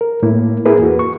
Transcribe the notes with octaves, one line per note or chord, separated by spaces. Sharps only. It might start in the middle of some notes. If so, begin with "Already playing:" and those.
A#4
A2 A#3 E4
A#3 E4 G#4 A#4 B4
E2 F#4
C#6